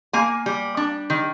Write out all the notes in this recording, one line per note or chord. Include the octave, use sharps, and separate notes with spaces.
A#3 G#5
G3
D4
D#3